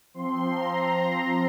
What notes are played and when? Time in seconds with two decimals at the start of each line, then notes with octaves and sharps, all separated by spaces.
0.14 F3 C4 C6
0.53 A#5